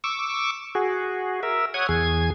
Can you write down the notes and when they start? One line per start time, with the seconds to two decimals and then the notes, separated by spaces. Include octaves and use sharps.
0.04 C#6 D6 E6
0.75 F#4 G#4
1.43 A#4 E5
1.74 C#5 F#5 D#6 G#6
1.89 E2 G#4 G#6